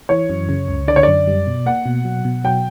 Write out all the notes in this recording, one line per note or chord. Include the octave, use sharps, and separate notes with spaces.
E3 C#5
F#2
C#3
C#2
D3 D5
C#5
F#2 D5
G3
B2
A#3 F#5
B2
F#3
B2
F#3 G5